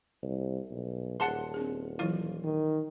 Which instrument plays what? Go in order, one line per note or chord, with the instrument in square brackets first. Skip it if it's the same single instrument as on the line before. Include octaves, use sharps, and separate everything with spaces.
[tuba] C2
B1
[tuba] D#1 [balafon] G#4 [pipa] F#5 A5 C6
[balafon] C4 D4 G#4
[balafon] E3 F#3 E4 [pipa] F4
[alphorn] D#3